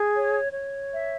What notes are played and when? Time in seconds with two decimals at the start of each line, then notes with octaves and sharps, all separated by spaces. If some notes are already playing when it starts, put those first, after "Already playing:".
Already playing: G#4
0.15 C#5
0.53 C#5
0.93 E5